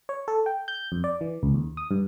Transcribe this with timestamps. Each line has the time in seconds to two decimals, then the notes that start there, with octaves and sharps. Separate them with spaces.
0.09 C#5
0.28 A4
0.46 G5
0.68 G6
0.92 F2
1.04 D5
1.21 E3
1.43 C#2
1.54 D#2
1.77 D#6
1.91 G2